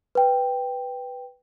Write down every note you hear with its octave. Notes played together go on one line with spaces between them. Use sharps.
B4 G5